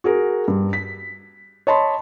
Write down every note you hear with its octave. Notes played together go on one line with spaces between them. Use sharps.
F#4 G#4 A#4
G2
B6
C#5 D#5 A5 B5 C6